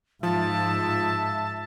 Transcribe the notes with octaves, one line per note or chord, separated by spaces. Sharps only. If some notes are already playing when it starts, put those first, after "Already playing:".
G#2 F3 E5 A5